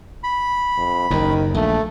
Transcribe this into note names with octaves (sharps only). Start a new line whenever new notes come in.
B5
F2
F#1 D#2 D#3
A#1 A3